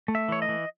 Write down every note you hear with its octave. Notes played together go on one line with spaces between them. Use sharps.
A3
E5
E3 C#5
D#5
E3